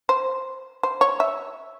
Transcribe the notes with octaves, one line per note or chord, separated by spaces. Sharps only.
C5
C5
C#5
E5